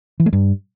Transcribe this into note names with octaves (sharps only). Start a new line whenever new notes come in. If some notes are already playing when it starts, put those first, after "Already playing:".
E3
A3
G2